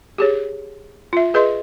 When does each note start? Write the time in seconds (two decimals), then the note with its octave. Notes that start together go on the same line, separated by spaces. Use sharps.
0.18 G4 G#4 C#5
1.13 F4 E5
1.34 G#4 B4 D#5 C6